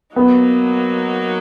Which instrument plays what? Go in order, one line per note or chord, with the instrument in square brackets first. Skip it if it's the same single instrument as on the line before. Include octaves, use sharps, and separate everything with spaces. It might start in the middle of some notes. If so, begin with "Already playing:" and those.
[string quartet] F#3 A#3 D#4 [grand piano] B3